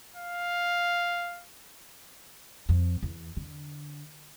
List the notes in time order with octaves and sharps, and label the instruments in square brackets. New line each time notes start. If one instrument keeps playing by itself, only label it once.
[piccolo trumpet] F5
[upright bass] F2
E2
D3